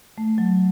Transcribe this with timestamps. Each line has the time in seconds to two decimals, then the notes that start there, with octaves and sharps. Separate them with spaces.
0.18 A3
0.38 F#3